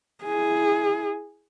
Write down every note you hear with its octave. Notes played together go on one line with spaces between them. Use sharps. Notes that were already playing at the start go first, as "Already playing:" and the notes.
E4 G#4